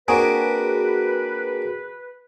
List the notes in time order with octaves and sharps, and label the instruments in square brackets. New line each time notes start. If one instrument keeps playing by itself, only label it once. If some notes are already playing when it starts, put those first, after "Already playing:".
[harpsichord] A#3 C4 D4 [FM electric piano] F#4 G#4 [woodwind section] B4